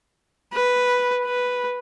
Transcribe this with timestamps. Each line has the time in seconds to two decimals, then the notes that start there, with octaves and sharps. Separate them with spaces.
0.53 B4
1.25 B4